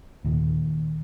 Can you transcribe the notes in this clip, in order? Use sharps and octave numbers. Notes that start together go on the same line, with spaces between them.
D#2 A#2